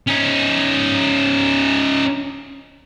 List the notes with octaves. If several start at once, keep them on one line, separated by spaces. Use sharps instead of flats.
C#4 D#4